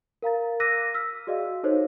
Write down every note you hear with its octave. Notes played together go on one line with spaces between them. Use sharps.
A#4 F5 A#5 A6
D6 E6 F#6 A#6 B6 D#7
E6 F6 B6
F#4 G#4 D5 D#5 F5
D#4 A4 C5 C#5 D#5